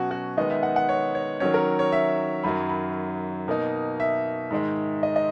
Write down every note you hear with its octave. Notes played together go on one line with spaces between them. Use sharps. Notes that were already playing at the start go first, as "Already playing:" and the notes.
Already playing: B2 F#3 C#4 F#4
F#4
D#3 G#3 B3 D#4 D#5
E5
F#5
F#5
C#5
C#5
D#3 F#3 C#4 C#5
A#4
C#5
E5
F#2 D#3 F#3 B5
B5
B2 A#3 D#4
E5
G#2 D#3 G#3
D#5
D#5